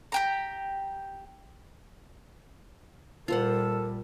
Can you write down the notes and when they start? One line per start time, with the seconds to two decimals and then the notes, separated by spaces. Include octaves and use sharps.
0.12 G4 G5 A#5
3.28 A#2 G3 F4 A4 A#4 C5 F#5